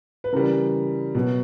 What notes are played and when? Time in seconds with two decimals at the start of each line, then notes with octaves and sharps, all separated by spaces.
0.24 B4
0.32 C#3 E3 G3 A#4
1.15 B2 F#3